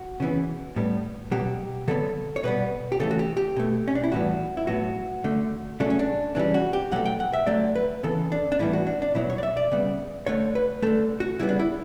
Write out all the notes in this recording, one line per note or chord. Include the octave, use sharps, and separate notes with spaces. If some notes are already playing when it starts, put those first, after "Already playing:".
Already playing: F#4
C#3 E3 B3
A2 G3 B3
B2 F#3 B3 G4
D3 F#3 B3 A4
C#5
B2 G3 B3 B4
G4
C#3 E3 A3 A4
F#4
G4
G4
B2 A3
C#4
D4
E4
A2 E3 G3 B3 F#4
E4
A2 F#3 B3 F#4
D3 A3
C#3 F#3 A3 D4
C#4
D4
C#3 E3 G3 D4
F#4
G4
B2 F#3 A3 F#5
G5
F#5
E5
D3 F#3 A3 D5
B4
C#3 E3 B3 A4
D4
D4
A2 E3 G3 B3 E4
F#4
D4
D4
B2 F#3 B3 E4
C#5
D5
E5
D5
C#3 G3 B3
D3 A3 C#5
B4
D3 A3 A4
F#4
C#3 G3 B3 E4
D4
E4